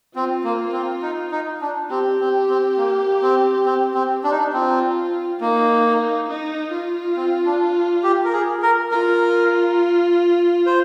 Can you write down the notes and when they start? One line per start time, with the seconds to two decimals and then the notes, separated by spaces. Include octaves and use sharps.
0.15 C4 F4
0.44 A#3
0.73 C4
1.02 D#4
1.31 D#4
1.61 D4
1.90 C4 G4
2.20 C4
2.49 C4
2.77 A#3
3.22 C4
3.66 C4
3.94 C4
4.24 D4
4.31 D#4
4.39 D4
4.53 C4 F4
5.40 A#3 D#4
6.29 D#4
6.72 F4
7.17 C4
7.46 D4
8.03 G4
8.25 A#4
8.33 G#4
8.62 A#4
8.91 F4 A#4
10.66 C5